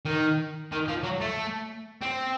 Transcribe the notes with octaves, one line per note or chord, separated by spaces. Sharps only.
D#3
D#3
F3
F#3
A3
C4